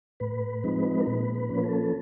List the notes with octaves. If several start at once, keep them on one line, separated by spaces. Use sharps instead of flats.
A2 B4
F3 G#3 C4 D#4
A#4
A#2 B4
B4
F3 A#3 C#4
A4